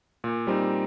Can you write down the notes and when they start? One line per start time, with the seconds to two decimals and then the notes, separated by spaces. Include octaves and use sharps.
0.24 A#2
0.47 G3 C4 D#4